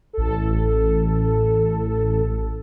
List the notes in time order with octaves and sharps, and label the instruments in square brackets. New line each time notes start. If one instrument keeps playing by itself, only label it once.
[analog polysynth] A1 A4